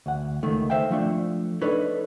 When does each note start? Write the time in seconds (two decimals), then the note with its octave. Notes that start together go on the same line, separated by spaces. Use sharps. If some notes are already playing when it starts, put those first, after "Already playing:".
0.06 D2 F#5
0.43 C#2 D#3 A3
0.70 C5 E5 F5 G5
0.90 F3 A3 D4
1.62 D4 D#4 A4 B4 C#5